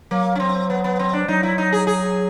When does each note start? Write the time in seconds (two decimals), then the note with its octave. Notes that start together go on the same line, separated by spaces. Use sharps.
0.11 F#3 A#3
0.35 C#4
0.40 C4
0.70 B3
0.84 B3
0.99 C4
1.13 D4
1.28 F#3 D#4
1.43 E4
1.58 D#4
1.73 G#4
1.87 G#4